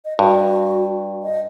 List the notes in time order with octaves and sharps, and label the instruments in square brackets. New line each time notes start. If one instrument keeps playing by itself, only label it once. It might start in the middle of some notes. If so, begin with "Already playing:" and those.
[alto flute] D#5
[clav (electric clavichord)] G2 [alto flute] F#4
[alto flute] D#5